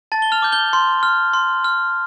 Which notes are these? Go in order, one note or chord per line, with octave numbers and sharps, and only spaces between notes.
A5 A6
G7
F6 F7
D6 G6
G6 G7
C6
F6
C6
F6